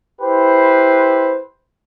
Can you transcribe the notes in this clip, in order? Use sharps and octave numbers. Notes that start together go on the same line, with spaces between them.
E4 G4 B4 C5